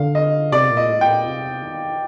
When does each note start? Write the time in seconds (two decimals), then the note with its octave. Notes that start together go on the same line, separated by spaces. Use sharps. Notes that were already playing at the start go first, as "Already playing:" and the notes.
Already playing: D3 F5
0.15 D#5
0.52 C3 D5
0.71 A#2
0.77 D#5
0.89 A2
1.01 G5
1.08 A#2
1.26 C3
1.63 D#3